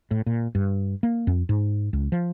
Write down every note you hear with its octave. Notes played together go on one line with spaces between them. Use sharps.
A2
A#2
G2
A#3
F2
G#2
C#2
F3